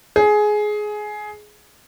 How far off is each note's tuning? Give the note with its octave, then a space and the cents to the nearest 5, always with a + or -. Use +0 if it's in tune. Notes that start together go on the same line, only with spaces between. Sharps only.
G#4 +15